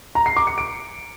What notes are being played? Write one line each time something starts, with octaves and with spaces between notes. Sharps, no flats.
A#5
C7
D6
C#7
D7